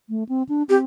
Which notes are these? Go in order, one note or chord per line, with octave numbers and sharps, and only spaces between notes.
A3
C4
D4
C4 G4